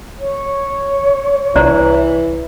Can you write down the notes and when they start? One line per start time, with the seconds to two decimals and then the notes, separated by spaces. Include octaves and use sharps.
0.19 C#5
1.56 C2 E3 C5 D5 A#5